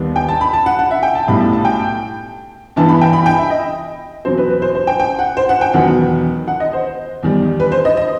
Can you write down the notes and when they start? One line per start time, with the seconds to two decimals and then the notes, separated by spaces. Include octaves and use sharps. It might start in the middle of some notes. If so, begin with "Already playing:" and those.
Already playing: D#2 D#3 G3 B3
0.16 G5
0.28 A5
0.41 B5
0.53 A5
0.66 F#5
0.79 F#5
0.91 E5
1.03 G5
1.15 A5
1.27 B1 A2 G3 B5
1.41 A5
1.53 A5
1.65 G5
2.76 G2 E3 B3 A5
2.89 B5
3.01 G5
3.13 B5
3.26 G5
3.38 E5
3.50 D#5
4.25 E2 B2 F#3 C4 C5
4.38 B4
4.50 B4
4.62 C5
4.75 C5
4.87 G5
5.00 G5
5.19 F#5
5.37 C5
5.49 F#5
5.61 G5
5.73 E1 E2 D#3 F#3 B3 F#5
6.48 F#5
6.60 D#5
6.73 C5
7.23 E2 D#3 G3
7.60 B4
7.72 C5
7.85 D#5
7.97 D#5